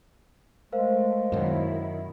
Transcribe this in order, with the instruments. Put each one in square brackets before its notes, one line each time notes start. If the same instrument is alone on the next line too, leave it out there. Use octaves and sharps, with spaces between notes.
[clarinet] G#3 [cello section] A3 [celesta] A#4 C5 F5
[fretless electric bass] F#2 B2 [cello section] D#3 E4